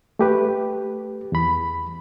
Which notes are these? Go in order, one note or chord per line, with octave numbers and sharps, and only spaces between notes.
A3 G4 B4
E2 B5